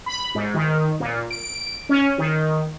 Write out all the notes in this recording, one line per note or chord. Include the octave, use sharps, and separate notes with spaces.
B5
G#2
D#3
A#2
D7
C#4
D#3